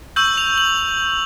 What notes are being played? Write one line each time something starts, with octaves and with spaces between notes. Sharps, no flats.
C#6 E6 G6 F#7
F7
F#7